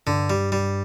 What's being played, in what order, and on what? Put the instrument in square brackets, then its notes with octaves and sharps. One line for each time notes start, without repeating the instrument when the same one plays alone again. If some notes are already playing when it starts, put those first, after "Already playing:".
[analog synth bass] G2 [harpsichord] D3
[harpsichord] G3
G3